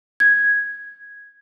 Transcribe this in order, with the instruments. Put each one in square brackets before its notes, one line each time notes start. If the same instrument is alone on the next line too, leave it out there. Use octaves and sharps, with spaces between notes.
[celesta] G#6